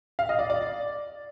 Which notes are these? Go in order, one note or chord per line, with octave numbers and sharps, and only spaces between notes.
F5
D#5
D5
D5